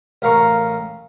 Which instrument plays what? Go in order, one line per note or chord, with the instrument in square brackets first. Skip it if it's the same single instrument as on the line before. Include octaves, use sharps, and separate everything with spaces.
[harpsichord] A1 A#4 F5 A#5 C#6